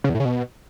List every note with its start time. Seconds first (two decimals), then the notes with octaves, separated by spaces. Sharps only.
0.04 C#3
0.09 E2
0.15 A2
0.20 C#3
0.25 B2